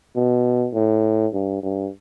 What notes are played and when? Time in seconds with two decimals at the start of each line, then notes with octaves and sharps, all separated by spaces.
0.16 B2
0.74 A2
1.33 G2
1.63 G2